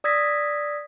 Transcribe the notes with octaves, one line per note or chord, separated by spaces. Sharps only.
D5 D#6 E6 G#6 A#6 B6